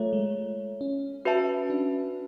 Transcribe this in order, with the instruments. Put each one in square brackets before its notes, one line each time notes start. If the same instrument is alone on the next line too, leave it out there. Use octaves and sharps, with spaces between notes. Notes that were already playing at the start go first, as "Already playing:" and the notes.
Already playing: [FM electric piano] A3 [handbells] F4 A4 C#5 E5
[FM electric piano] G#3
C#4
[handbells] F#4 B4 E5 A5
[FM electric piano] D4